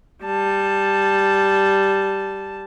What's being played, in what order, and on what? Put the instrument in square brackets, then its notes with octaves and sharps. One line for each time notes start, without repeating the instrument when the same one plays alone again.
[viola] G3 A5